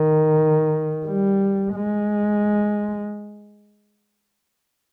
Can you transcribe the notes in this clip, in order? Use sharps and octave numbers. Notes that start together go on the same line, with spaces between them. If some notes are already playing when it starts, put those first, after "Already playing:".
Already playing: D#3
G3
G#3